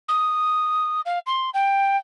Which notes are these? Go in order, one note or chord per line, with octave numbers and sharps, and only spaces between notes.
D#6
F5
C6
G5